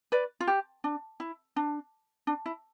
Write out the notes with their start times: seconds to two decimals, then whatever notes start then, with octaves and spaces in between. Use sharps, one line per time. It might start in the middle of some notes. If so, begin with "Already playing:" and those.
0.12 B4 D5
0.40 F4
0.47 G4
0.84 D4
1.20 E4
1.56 D4
2.27 D4
2.46 E4